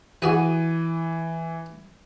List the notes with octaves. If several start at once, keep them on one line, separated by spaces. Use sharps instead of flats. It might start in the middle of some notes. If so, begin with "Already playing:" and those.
E3 F#4 G#4 B4 D#7